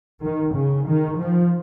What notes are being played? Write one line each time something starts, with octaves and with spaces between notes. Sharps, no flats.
D#3
C#3
D#3
F3